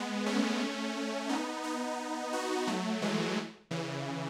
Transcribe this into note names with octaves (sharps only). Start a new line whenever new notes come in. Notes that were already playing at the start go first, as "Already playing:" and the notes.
Already playing: G#3 B3
A3 C#4
B3 D#4
B3 D#4
D#4 F#4
F#3 A3
E3 G#3
C#3 E3